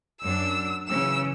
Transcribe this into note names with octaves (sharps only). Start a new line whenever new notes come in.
F#2 D4 E6
C#3 E3 F#3 E6